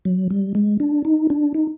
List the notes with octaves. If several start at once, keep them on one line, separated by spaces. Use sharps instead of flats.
F#3
G3
G#3
D4
D#4
D4
D#4